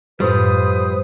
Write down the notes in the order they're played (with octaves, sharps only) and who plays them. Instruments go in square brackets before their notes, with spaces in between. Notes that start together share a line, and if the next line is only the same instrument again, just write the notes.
[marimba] F#2 A2 [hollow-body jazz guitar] F3 G3 [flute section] B4 D#6 [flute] C5